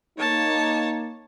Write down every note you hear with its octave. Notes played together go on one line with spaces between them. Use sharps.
A#3 D#4 C#5 A5